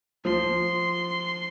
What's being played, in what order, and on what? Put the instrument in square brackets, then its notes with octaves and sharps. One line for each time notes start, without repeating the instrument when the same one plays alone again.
[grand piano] F3 [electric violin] C6